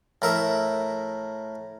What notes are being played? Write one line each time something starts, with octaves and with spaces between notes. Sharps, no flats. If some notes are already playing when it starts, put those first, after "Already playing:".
A2 A#4 E5